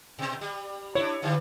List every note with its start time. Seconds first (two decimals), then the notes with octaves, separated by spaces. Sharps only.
0.19 B2 C4
0.41 G3
0.95 D4 E4 C#5
1.22 D3 E3 G3